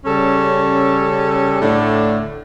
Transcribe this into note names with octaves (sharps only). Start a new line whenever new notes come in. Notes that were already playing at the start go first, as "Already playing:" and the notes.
C#3 G3 C#4 A4
A2 D3 A3 D4